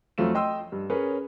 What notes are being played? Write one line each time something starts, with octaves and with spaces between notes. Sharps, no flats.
F2 F#3 A3 F4 E7
D#5 G5 C6 E6
G2
C#4 G#4 A#4 B4 C#5